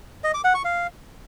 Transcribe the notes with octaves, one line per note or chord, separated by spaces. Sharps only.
D#5
D6
F#5
C#6
F5